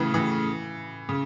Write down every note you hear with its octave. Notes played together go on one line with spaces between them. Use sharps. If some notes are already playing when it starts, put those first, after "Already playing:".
Already playing: A2 C#3 E3
E3
C#3